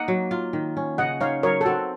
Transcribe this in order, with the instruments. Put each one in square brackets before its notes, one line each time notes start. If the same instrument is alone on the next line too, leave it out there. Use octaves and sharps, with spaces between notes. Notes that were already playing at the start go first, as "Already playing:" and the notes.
Already playing: [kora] A#3 D#4 [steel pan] D#5 F#5
[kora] F#3
F4
D#3
C#4
[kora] C#3 [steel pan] D#5 F#5
[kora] D#4 [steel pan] C#5 F5
[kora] F#3 [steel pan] A#4 C#5
[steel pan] A4
[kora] C4 [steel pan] F#4